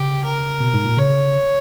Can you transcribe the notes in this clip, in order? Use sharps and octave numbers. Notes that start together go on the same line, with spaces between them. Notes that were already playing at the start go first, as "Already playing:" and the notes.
Already playing: C#3 G4
A#4
B2
G#2
A#2
C#3 C#5